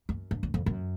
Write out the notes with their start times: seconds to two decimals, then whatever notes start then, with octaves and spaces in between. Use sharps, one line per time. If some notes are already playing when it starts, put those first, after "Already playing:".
0.09 F#2
0.31 G2
0.43 F#2
0.54 F2
0.66 F#2